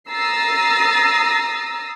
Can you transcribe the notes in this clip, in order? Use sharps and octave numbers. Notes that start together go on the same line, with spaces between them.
A#5 D#6 E6 A6 A#6 C7